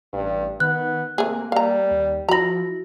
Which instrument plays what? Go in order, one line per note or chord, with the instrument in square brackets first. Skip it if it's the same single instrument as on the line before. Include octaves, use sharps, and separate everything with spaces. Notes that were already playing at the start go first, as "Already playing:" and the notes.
[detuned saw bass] A1 [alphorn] G2
[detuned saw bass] D#3 [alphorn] B3 [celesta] F#6
[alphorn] C3 [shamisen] A3 G#4 [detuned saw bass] A#3
[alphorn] G3 [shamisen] F5 A#5
[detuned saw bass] D#2
[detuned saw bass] F3 [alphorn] E4 [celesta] F#4 A#6 [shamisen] A#5 B5